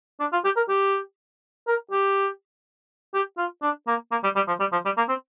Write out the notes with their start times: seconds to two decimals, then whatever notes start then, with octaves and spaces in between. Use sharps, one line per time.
0.20 D4
0.33 F4
0.45 G4
0.56 A#4
0.69 G4
1.68 A#4
1.91 G4
3.14 G4
3.38 F4
3.62 D4
3.87 A#3
4.12 A#3
4.23 G3
4.36 G3
4.48 F3
4.60 G3
4.72 F3
4.85 G3
4.97 A#3
5.09 C4